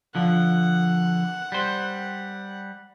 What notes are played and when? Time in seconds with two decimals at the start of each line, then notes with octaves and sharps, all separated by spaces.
0.15 D3 F3 F#5
1.52 G3 C5